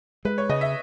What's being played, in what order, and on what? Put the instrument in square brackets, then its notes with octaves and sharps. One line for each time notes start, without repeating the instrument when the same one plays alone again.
[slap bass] G#3 [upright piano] B4
[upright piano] C#5
[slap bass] C#3 [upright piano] D#5
[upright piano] E5